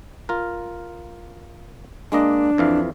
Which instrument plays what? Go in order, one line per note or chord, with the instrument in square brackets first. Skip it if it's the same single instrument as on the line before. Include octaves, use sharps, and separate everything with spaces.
[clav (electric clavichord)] F4 A#4
[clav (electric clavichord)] G#3 A#3 D#5 [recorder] D4
[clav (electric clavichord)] F2 E3 F5